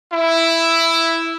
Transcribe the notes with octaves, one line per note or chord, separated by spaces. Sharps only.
E4